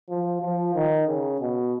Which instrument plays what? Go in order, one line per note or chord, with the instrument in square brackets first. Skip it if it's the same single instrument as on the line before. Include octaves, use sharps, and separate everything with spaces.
[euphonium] F3
F3
D#3
C#3
B2